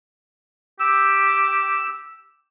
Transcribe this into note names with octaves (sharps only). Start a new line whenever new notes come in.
G4 E6